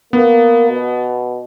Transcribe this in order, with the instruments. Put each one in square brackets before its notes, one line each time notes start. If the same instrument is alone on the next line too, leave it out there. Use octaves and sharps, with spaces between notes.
[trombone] A#3 [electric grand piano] B3
[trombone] B2